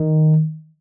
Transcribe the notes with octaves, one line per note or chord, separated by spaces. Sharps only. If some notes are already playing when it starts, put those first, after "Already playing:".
Already playing: D#3